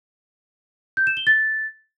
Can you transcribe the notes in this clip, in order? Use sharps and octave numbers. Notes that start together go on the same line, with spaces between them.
G6
E7
G7
A6